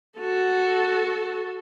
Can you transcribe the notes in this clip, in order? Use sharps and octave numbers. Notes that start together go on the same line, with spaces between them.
F#4 A4